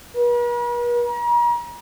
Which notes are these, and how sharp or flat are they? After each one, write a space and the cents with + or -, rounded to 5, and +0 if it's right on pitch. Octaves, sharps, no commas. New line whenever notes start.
B4 -45
A#5 +40